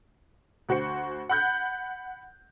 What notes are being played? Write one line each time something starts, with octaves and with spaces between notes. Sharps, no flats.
D2 F#4 C5 C#7
F#5 B5 F#6 G6